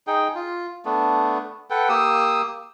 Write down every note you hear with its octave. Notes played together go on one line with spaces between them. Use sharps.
D#4 G#4 G5
F4
A3 B3 D4
A4 B4 F#5 G5
A#3 G4 D#6 E6